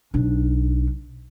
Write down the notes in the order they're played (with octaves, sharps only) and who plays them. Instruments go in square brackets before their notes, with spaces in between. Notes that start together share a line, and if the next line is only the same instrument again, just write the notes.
[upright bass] B1 D4